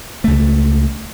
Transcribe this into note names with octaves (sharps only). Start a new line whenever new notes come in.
C#2 A3